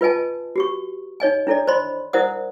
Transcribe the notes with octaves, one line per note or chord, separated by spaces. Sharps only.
F4 B4 D#5 G#5 A5
F#4 G4 C#6
D#4 C#5 D#5 G#5
D4 E4 A4 C#5 D5
C5 D5 D#5 B5 C6
E4 A#4 C5 D5 F#5 D#6